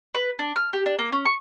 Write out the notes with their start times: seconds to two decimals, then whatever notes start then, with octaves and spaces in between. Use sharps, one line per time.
0.15 B4
0.39 D4
0.56 F6
0.73 G4
0.86 D4
0.99 A#3
1.13 C#4
1.25 C#6